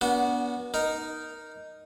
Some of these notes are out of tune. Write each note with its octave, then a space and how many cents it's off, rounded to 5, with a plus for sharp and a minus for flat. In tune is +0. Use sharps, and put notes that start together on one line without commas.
B3 -30 D4 -40 F#4 -5
D#4 +0 A#4 +0